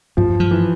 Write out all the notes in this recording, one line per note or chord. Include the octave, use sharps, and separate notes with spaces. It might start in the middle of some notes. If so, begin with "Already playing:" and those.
G2 F3
F3
E3